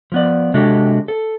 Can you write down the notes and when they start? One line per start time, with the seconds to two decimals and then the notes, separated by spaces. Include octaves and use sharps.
0.12 F3 B3 D5
0.54 C3 G#3 D4 F#4 G4 A4
1.08 A4